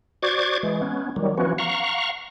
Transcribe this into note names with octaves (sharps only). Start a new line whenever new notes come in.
F#4 C5 D5 C#6 D6 G#6
E3 G#3
B3 C#4
D#3 F#3 G3
E3 F3 B3 C#4 F#4
F5 F#5 A#5 C#6